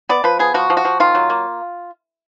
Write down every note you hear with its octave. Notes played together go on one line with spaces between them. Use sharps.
B3 D5
F3 B4
B3 G#4
F3 F#4
F3
F#4
F3
D#3 F4
F#3
A#3